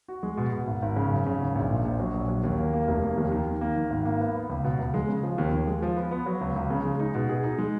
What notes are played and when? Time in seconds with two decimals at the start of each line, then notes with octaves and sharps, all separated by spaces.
0.08 F#4
0.23 G#3
0.37 B2
0.52 B2
0.67 G#1
0.82 G#1
0.96 C#3
1.11 F#2
1.26 C#3
1.41 G#1
1.55 A#1
1.70 A#2
1.85 A#1
2.00 F#3
2.14 A#1
2.28 F#3
2.43 D#2
2.58 A#3
2.73 A#3
2.88 F1
3.02 A#3
3.17 D#2
3.31 D#3
3.47 D#3
3.61 A#3
3.76 D#3
3.90 G#1
4.05 A#3
4.20 B3
4.35 B3
4.50 C#2
4.64 B2
4.79 C#2
4.94 G#3
5.09 C#3
5.23 F3
5.38 D#2
5.52 D#2
5.67 G#3
5.82 F3
5.97 B3
6.11 B3
6.26 F#3
6.41 C#2
6.56 C#2
6.70 C#3
6.85 G#3
7.00 D#4
7.15 B2
7.29 G#4
7.44 D#4
7.59 G#3